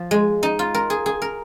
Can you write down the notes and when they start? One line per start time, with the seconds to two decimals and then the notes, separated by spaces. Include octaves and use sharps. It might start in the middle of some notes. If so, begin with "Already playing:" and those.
Already playing: F3
0.11 G#3
0.43 D#4
0.59 F4
0.74 A#4
0.90 G#4
1.06 G#4
1.22 A#4